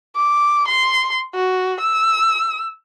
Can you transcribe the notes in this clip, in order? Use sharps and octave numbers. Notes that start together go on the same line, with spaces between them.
D6
C6
F#4
E6